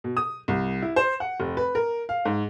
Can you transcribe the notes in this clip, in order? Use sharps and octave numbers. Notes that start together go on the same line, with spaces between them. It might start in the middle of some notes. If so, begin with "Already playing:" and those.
B2
D#6
C2
E4
C5
F#5
F1
B4
A#4
F5
G#2